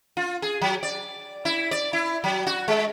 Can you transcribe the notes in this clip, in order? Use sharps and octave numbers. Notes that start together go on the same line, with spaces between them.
F4
G#4
F#3
D5
E4
D5
E4
F#3
F#4
G#3